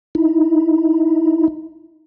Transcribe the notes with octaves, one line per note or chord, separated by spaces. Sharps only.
D#4 E4